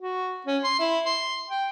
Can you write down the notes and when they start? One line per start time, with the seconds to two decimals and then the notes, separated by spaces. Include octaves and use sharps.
0.01 F#4
0.46 C#4
0.64 C6
0.79 E4
1.06 C6
1.49 G5